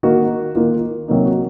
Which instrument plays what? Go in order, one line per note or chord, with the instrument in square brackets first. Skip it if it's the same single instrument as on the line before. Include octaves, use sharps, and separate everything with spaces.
[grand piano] D#3 A#3 D#4 F#4
D#3 A#3 D#4 F4
C3 F#3 A#3 D#4
F#4